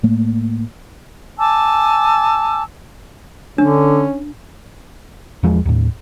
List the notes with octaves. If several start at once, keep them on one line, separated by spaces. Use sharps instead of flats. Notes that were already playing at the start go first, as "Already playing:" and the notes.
A2 A3 A#3
G#5 A5 D6 E6
D3 C#4 D4
E2 F3 G#3
D#2 A2